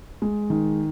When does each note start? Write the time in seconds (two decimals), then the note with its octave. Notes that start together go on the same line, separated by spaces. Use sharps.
0.22 G#3
0.50 D#3